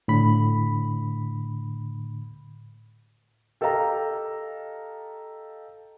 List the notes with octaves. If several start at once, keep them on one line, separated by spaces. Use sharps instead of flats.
A2 D3 B5
G4 A4 D#5 F5 A#5